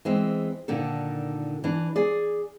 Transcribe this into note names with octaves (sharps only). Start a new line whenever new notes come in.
E3 G#3 C4
A#2 D3 D#3 A4
E3 D4
G#4 D5